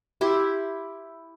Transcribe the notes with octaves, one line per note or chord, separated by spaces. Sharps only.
E4 G4 C6